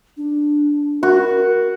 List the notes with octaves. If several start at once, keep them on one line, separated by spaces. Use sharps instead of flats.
D4
F#4 A#4